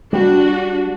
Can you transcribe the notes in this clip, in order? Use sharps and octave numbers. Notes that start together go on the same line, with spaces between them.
G3 D4 F#4